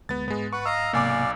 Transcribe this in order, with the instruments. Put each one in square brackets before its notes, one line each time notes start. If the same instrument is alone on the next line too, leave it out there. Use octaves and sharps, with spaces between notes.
[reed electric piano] D2 G#3 [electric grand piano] B3 A6
[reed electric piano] G#2 [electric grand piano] G#3 B3
[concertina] B4 F#5 [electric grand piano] C#6
[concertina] D#5 F5 A#5 [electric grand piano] E6
[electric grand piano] B1 G#5 D6 [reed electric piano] G#2 C3 A#3 [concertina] D5 F5